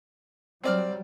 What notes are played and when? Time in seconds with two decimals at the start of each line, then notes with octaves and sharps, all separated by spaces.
0.64 F#3 G3 C4 D5 F6